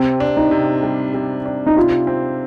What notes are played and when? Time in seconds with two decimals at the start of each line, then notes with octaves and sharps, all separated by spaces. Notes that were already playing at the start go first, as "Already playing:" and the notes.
Already playing: C3 C4
0.20 D4
0.37 D#4
0.51 C3
0.83 G3
1.14 C3
1.46 D4
1.66 D#4
1.77 C3 F4
2.07 C4